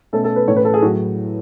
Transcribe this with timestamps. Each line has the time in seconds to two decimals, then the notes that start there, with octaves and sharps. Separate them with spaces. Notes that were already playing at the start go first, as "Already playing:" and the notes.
0.13 B2 A3 C#4 A4
0.24 A4
0.36 B4
0.48 A2 E3 A3 C#4 C#5
0.56 B4
0.65 A4
0.74 G#4
0.82 A2 F#3 F#4